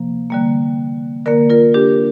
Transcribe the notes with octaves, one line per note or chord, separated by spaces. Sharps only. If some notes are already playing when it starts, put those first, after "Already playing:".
Already playing: C3 F3 A#3
D3 G3 A#3
D3 A#3 A#4 D5
F4 A#4
D4 G4